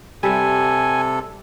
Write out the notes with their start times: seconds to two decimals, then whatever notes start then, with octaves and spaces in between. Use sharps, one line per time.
0.23 C3 G3 G4 A4 E5 G#5